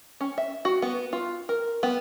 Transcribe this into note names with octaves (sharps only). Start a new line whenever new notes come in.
C#4
E5
F#4
B3
F4
A#4
B3